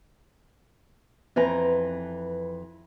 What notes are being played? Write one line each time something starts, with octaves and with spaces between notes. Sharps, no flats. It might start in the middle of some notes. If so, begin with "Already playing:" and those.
F2 E3 B4 A#5